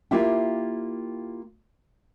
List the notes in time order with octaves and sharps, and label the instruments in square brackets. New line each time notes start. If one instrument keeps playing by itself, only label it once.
[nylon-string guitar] A#3 E4 F4 G4 E5 G5